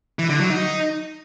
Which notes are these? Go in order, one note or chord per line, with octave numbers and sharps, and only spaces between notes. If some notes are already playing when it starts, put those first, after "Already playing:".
E3
D3
F#3
D#4